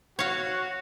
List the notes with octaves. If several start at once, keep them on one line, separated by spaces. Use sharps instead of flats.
F#4 C#5 F5